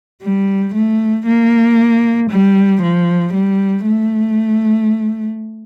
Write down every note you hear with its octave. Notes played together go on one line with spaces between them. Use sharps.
G3
A3
A#3
G3
F3
G3
A3